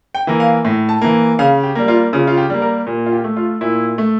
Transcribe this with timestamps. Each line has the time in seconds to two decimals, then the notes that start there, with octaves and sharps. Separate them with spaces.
0.15 G5
0.27 E3 A#3
0.40 F5
0.65 A2
0.89 A5
1.01 E3 A#3
1.39 C#3 F5
1.63 G4
1.75 G3 A#3
1.88 F4
2.13 C#3 F4
2.27 F4
2.37 G4
2.50 G3 A#3
2.62 A#4
2.87 A#2
3.06 F4
3.12 G4
3.24 A3
3.37 F4
3.61 A#2 E4
3.98 A3